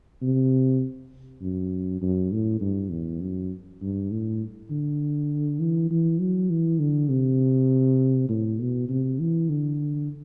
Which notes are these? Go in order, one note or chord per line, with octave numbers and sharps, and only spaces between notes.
C3
F#2
F#2
A2
G2
E2
F#2
G2
A2
D3
E3
E3
F#3
E3
D3
C3
A2
B2
C3
E3
D3